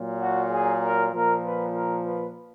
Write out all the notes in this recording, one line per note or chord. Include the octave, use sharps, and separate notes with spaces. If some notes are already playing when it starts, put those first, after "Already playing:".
Already playing: A#2 F#3
F#4
G#4
A#4
A#2 F3 A#4
B4
A#4
B4